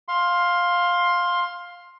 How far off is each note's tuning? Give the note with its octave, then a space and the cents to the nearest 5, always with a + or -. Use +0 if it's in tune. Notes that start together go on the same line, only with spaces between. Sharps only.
F5 +10 C6 +10